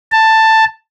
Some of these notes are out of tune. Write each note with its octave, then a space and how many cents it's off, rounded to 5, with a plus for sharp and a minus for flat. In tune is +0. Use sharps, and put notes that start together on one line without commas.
A5 +10